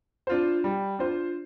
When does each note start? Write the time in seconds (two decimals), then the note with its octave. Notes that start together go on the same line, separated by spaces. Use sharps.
0.27 D4 F4 C5
0.64 G3
0.99 D4 F4 C5